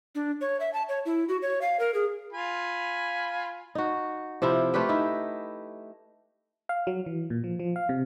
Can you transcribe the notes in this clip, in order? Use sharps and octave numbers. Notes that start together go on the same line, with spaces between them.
D4
C#5
E5
A5
C#5
E4
F#4
C#5
F5
A#4
G#4
F4 G#5 B5
D#4 F#4
C3 F3 E4 F4
A3 F4 G4 B4
D#4 E4
F5
F#3
E3
A#2
F3
F3
F5
C3